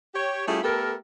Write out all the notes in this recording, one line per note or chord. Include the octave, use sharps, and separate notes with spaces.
G4 C#5
G3 A3 C#4 E4 F4 G#4
A3 B3 G4 A4 A#4